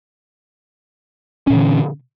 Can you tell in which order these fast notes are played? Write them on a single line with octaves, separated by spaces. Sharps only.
C#4 A#2 E3 D3